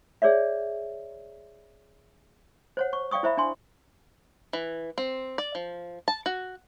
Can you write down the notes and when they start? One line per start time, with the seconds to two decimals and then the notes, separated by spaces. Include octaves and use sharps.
0.22 G#4 C#5 D5 E5
2.77 C5 C#5 F#5
2.93 C#6
3.11 D5 F5 G5 C#6 D#6
3.23 E4 C5 E5 B5
3.37 D4 G#5 C6
4.53 E3
4.98 C4
5.38 D5
5.55 F3
6.08 A5
6.26 F#4